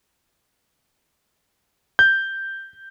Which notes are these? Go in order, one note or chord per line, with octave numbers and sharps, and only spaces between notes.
G6